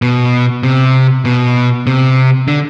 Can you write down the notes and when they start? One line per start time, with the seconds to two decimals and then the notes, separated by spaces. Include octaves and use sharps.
0.02 B2
0.63 C3
1.25 B2
1.87 C3
2.48 D3